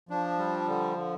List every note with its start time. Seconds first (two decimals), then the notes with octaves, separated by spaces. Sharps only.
0.09 F3 D4
0.38 G3
0.68 D3
0.97 D3